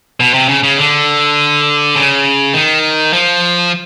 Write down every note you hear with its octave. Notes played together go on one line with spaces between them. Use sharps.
B2
C3
C#3
C#3
D3
C#3
D#3
F3